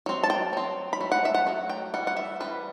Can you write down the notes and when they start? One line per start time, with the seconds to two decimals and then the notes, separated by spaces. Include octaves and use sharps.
0.06 F#3 C4
0.23 A5
0.30 G5
0.53 F#3 C4
0.93 B5
1.01 F#3 A3
1.12 F#5
1.25 E5
1.35 F#5
1.47 F#3 A3
1.69 G5
1.94 E3 G3 F#5
2.07 F#5
2.17 E5
2.40 E3 G3 C4 B4